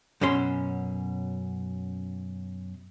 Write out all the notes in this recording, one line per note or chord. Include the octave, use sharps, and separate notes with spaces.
F#2 B2 C#4 C6